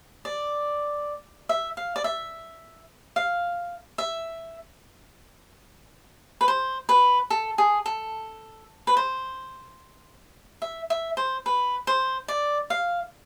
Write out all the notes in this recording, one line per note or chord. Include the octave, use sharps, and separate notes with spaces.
D5
E5
F5
D5
E5
F5
E5
B4
C5
B4
A4
G#4
A4
B4
C5
E5
E5
C5
B4
C5
D5
F5